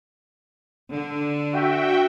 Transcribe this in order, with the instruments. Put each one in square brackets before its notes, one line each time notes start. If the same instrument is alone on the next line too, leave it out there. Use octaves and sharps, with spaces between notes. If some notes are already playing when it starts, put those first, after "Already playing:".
[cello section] D3
[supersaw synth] F#4 E5 G5